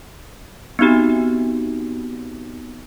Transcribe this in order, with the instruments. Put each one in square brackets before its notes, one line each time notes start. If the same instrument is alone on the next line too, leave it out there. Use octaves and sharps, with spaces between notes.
[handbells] B3 C4 D#4 F#4 G4